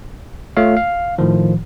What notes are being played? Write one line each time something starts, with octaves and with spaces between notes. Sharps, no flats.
A3 F4 C#5 F5
F5
A2 D#3 F3